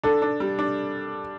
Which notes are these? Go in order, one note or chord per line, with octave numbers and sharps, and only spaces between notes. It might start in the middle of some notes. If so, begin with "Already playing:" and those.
D4 A4
D4
G3
D4